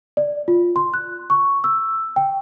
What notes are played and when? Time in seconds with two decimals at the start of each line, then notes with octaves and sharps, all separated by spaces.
0.17 D5
0.48 F4
0.76 C6
0.94 F#6
1.30 C#6
1.64 E6
2.16 G5